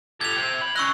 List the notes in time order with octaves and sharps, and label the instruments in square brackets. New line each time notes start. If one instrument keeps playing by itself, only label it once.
[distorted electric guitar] G4 A4 [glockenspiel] G#6 F7
[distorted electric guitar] G4 C5
B5
[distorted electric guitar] C#4 D#5 [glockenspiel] C#6 E6 F#6